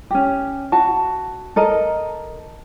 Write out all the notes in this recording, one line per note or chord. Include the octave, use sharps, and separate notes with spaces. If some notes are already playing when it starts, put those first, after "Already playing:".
C#4 G4
F#4 A5
A4 A#4 D#5